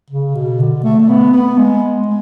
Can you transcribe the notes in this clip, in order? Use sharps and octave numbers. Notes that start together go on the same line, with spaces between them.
C#3
B2
D3
A3
A3
B3
B3
G#3
G#3